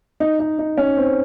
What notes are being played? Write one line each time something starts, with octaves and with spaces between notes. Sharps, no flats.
D#4
D#4
D#4
C#4
C4